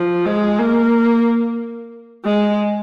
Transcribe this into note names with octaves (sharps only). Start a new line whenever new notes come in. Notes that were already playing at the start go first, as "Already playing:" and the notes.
Already playing: F3
G#3
A#3
G#3